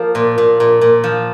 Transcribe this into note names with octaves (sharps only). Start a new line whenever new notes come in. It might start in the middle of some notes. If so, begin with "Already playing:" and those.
Already playing: F3 A#3
A#2
A#2
A#2
A#2
F3